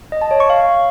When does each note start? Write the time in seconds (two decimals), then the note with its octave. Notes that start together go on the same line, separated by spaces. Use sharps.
0.12 D#5
0.22 A5
0.31 C#5
0.40 C#6
0.50 F5